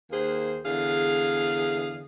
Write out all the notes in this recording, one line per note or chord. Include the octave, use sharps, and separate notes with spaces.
D#2 A#3 G#4 C5
E2 D3 G#4 F5